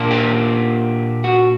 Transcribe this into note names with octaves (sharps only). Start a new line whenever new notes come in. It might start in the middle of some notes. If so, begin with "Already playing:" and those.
Already playing: A#2 A#3 D4
G4
F#4